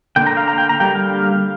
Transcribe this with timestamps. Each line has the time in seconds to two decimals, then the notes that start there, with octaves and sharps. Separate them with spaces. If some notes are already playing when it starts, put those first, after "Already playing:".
0.16 D3 A#3 G5
0.27 A#5
0.37 F5
0.48 A#5
0.58 G5
0.69 A#5
0.80 D3 G3 A#3 G5
0.95 F5